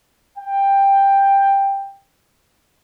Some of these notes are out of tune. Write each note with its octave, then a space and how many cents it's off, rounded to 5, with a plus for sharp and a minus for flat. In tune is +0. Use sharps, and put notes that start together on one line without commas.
G5 +10